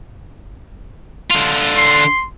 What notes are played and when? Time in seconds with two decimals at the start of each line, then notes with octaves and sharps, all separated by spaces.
1.31 D3 F4
1.77 C6